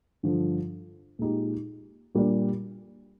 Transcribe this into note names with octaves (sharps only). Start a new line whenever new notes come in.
G2 D3 F3
A#2 G#3 D#4 G4
A#2 G3 A#3 D4